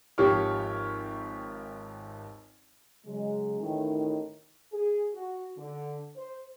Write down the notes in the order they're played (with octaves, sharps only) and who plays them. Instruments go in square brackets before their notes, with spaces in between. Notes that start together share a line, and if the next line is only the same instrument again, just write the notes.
[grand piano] G#1 F3 G4 C#5 C#6 F6
[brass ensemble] C#3 F#3 G#3
A1 A2 D#3
[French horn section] G#4
F#4
D3
C5